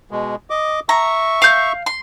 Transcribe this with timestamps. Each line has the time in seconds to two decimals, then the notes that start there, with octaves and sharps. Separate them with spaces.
0.11 B2 G#3
0.50 D#5 D6
0.89 E5 A#5 C#6
1.42 F5 G6
1.86 C6